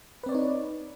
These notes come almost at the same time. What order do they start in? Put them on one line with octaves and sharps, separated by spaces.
B4 C4 D5 C#5 D#4